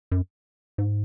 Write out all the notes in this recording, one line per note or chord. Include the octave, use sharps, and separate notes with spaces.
F#2
G#2